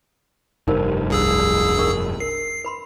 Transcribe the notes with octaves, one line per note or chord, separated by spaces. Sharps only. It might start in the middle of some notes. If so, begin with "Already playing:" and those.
F1 G2 D#4 A#4 C5
C2 D4 G#4 E6
D4 A#4 C#6
A#4 C7
B4 B5 C6